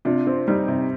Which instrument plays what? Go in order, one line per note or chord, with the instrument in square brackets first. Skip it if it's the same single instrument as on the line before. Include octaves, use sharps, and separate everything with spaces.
[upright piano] C3 [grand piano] D4 F4
[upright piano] C4
[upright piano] G3 [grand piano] D#4 G4
[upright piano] C3